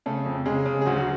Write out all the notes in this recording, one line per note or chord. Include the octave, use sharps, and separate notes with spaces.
C#3 A3 A4
F2
C#3 G#3 G#4
C#3
G#4
D2 F#3 F#4
F#3 F#4